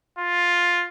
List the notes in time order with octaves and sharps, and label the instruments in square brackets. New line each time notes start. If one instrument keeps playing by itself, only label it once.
[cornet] F4